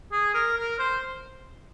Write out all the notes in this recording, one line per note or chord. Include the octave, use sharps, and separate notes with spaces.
G#4
A#4
A#4
C5